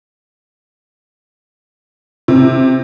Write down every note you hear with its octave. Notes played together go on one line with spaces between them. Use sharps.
C3